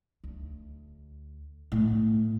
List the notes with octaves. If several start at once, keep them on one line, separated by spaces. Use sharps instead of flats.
D2
A2 B3